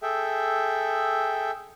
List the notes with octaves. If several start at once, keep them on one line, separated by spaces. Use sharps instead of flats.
G#4 A4 E5 G5